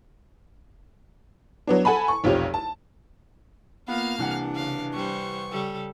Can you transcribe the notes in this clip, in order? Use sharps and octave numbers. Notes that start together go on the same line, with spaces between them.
F#3 B3 D4
A4 F#5 G#5 A5 B5
C#6
F1 B1 C4 F4 G4 C#5
A5
A#3 B3 F4 F5 F6
C2 E3 D4 F#5
C#3 F5
G3 C5 C#6
C#3 G3 A4